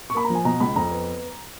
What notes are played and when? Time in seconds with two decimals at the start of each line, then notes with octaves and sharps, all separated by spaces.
0.10 C#6
0.15 A#3 B5
0.25 A#5
0.30 F3
0.35 G#5
0.45 B2 A#5
0.60 C#2 B5
0.76 F2 A#5
0.91 B3